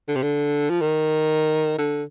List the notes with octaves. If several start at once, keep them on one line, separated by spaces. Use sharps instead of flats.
D3
C3
D3
F3
D#3
D3